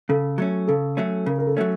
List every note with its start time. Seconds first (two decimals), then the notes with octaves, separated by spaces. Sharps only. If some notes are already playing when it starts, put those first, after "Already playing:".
0.10 C#3 A4
0.38 F#3 A3 C#4
0.68 C#3 A4
0.97 F#3 A3 C#4
1.26 C#3 A#4
1.38 A#4
1.47 A4
1.57 F#3 A3 C#4